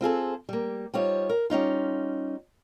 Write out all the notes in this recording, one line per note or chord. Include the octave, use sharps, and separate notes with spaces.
C4 F4 G#4 A4
G3 A#3
G3 D#4 F4 C5 C#5
A#4
G3 C#4 D#4 F4